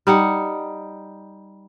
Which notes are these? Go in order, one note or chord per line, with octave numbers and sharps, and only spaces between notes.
G3 D#4 F#5